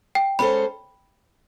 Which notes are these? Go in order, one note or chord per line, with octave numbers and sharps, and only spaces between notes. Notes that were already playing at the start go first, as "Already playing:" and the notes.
G5
G#3 C#4 F#4 A4 C5 B5